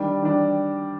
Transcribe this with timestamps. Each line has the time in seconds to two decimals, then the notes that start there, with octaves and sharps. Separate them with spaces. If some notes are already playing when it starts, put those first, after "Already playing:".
Already playing: D#3 G3 D4 D5
0.22 D#3 G3 D4